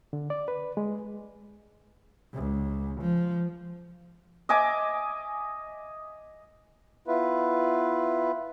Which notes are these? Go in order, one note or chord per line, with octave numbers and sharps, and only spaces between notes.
D3
D5
B4
G#3
C#2
F3
D#5 E5 G#5 D6
B3 E4 F4 B4